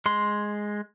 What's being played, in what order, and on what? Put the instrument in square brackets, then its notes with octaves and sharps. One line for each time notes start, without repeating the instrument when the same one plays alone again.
[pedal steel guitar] G#3 C6